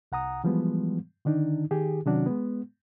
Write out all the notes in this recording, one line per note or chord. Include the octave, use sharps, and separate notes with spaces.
C2 F#5 A#5 D#6
E3 F3 G3 G#3 B3
D3 D#3 D4 D#4
D#3 G4 G#4
C3 D#3 F#3 C#4 D4 F#4
G#3 B3